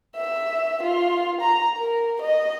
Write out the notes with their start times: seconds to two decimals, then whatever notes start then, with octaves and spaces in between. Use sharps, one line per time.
0.16 E5
0.83 F4
1.40 A#5
1.78 A#4
2.21 D#5